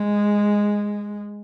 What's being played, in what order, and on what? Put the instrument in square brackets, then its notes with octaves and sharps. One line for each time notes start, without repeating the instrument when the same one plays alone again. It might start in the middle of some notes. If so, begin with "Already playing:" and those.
Already playing: [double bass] G#3